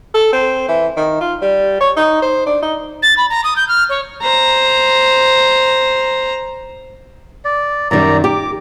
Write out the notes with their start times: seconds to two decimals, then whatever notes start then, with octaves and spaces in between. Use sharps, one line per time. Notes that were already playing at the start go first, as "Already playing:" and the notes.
0.14 A4
0.33 C4
0.68 E3
0.97 D#3
1.21 F4
1.42 G3
1.81 C#5
1.97 D#4
2.22 C5
2.46 D4
2.62 D#4
3.02 A6
3.17 B5
3.30 A#5
3.44 D#6
3.56 G6
3.68 F6
3.90 C#5
4.23 C5 A#5
7.45 D5
7.91 F#2 D#3 G3 D5 A#5
8.24 G4 D6